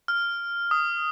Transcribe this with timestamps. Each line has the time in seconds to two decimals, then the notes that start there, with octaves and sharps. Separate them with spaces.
0.08 F6
0.71 D#6